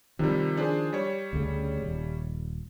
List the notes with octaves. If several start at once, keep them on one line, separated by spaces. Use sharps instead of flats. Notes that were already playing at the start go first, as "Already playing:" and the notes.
C3 D#3 F3 G3
D4 G#4 C5
G3 C#5
D2 C#3
D#1